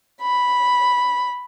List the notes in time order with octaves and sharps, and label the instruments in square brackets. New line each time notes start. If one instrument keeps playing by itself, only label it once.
[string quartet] B5